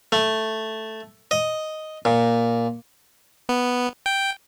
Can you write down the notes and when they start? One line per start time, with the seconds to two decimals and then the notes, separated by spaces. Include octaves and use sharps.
0.12 A3
1.31 D#5
2.05 A#2
3.49 B3
4.06 G5